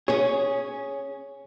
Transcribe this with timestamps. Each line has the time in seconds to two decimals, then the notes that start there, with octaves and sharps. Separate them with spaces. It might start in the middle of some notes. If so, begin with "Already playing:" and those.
0.08 C#4 G#4 C#5